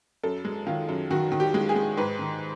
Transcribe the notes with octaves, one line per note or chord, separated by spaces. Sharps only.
F#2 A4
G#3
D#3 F4
F#2
D#3 F#4
D#3
G4
G#3
G#4
G#3
G#2 B4
D#3